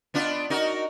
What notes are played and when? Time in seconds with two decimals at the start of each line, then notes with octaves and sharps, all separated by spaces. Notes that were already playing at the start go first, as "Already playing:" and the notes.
0.14 B3 D4 F4
0.50 D#4 F#4 A#4